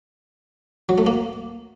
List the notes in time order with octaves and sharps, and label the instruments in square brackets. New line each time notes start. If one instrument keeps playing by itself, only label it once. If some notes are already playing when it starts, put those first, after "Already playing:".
[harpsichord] F#3
A3
A#3